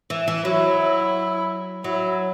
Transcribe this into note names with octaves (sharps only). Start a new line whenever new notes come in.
E3
E3
F#3 E4
F#3 E4